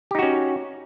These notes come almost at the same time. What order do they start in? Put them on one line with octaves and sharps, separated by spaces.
G4 D#4 F#4 C#4